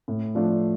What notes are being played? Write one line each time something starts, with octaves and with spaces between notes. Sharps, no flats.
A2
F3 A3 D4 F4